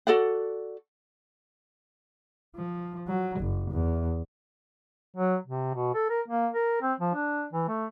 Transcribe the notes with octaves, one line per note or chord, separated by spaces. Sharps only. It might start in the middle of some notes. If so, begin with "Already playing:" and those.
F#4 A4 D5 F#5
F3
F#3
F#1
E2
F#3
C3
B2
A4
A#4
A#3
A#4
C4
F3
D4
E3
A3